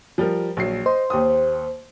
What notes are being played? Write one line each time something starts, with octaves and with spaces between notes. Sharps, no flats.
F3 G3 A#4
A#1 F#3 C7
C5 D#5
D#2 G4 D#6